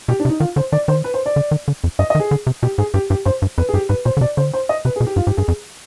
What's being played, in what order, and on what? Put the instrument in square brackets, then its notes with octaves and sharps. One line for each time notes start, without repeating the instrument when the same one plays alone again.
[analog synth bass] B2 [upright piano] G4
[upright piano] D4
[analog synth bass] C3
[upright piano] D#4
[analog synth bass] D#3 [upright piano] F4
[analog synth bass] D3 [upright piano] C5
[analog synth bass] D#3 [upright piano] D5
[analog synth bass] D#3 [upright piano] C5
[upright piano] B4
C5
D5
[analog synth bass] D3
D#3
D3
F2
[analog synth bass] G2 [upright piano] D#5
[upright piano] D#5
[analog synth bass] D#3
[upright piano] G#4
[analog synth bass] D3
C3
[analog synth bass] B2 [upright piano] G4
[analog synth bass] G#2 [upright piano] G#4
[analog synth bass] G2 [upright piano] G4
[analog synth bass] G2 [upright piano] G4
[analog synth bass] G2 [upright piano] C5
[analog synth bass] G2
[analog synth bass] F2 [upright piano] B4
[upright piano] G#4
[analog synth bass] G2 [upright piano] G4
[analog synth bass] G#2 [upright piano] B4
[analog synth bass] B2 [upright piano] C5
[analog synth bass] D3
[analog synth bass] C3 [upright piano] D5
[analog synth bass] D3 [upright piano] C5
[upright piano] C5
D#5
[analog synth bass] C3 [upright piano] B4
[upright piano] G#4
[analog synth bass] B2
[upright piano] G4
[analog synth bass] G2 [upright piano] F4
[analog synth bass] G#2 [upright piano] G4
[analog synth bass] G2 [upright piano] G#4
[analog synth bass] F2